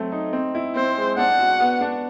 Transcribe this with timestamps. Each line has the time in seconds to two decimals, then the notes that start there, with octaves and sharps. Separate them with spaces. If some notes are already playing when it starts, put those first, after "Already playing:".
Already playing: F#3 A3 C4
0.12 D#4
0.33 C4
0.55 E4
0.75 C4 C5
0.97 G#3
1.18 D4 F#5
1.39 F#4
1.60 B3
1.81 D4